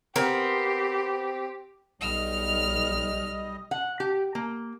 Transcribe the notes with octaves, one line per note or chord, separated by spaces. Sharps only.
B3 C4 G4 A#4
B1 G3 D#5 F6
F#5
G4
A#3